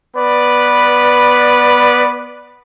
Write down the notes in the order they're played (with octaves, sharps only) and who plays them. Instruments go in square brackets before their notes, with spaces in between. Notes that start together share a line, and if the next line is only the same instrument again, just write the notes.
[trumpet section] B3 B4 D5